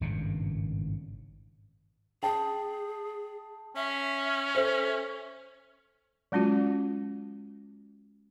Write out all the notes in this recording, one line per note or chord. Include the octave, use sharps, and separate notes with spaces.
G#1 G2 A#2 C#3
G#4 G5 A5
C#4 E5
A4 C5 E5
F#3 G#3 C#4 F4 F#4